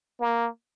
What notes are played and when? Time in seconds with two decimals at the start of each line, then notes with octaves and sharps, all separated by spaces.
0.20 A#3